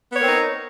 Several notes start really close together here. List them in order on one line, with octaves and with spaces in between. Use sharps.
B3 C#5 A#4 C4 D#4